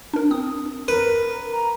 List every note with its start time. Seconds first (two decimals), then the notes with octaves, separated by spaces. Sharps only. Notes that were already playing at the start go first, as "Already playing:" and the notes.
0.14 D4 A#4
0.31 C4 D#6
0.88 A#4 B4
1.52 A#5